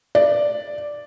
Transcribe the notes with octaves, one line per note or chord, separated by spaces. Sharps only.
D5